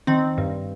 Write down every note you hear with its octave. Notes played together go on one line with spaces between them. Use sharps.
D#3 C4
G2